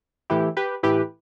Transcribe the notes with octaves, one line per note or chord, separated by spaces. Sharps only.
A2 E3 E4 G4
G4 B4
A2 E3 G4 B4